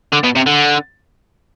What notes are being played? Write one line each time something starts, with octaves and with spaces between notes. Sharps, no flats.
D3
B2
C3
D3